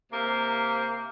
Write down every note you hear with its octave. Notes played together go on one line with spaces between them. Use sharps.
C3 A#3